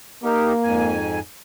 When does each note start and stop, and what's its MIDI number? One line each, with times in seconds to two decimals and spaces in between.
0.24 0.98 58
0.24 0.53 63
0.24 0.53 67
0.24 0.53 70
0.64 1.19 41
0.64 1.19 44
0.64 1.19 80